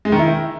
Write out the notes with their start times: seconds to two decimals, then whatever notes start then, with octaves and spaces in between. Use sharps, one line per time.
0.05 G#3
0.12 D#3
0.19 E4